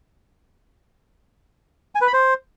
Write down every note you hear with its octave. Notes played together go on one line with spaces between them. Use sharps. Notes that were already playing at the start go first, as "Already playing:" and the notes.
G#5
B4
B5
C5